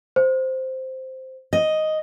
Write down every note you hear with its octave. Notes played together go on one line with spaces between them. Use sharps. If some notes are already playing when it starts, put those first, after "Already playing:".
C5
D#5